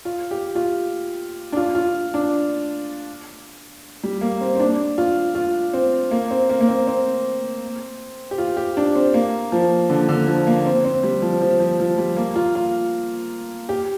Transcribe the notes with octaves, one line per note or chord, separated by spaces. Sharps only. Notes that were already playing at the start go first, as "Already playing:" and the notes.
F4
G4
F4
D4
F4
F4
D4
G3
A#3
C4
C4
D4
F4
F4
C4
A#3
C4
A#3
A#3
C4
C4
G4
F4
G4
D4
C4
A#3
F3
D3
D3
F3
A#3
C4
C4
G3
F3
F3
F3
F3
G3
A#3
F4
F4
G4